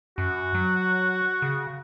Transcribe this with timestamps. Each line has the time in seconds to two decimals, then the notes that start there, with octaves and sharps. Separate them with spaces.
0.18 F#2 F#4
0.54 F#3
1.42 C#3